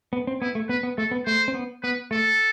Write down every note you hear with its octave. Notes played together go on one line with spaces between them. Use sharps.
B3
C4
B3 E4
A3
B3 B4
B3
A3 A4
B3
A3 C5
C4
B3
B3 B4
A3 A4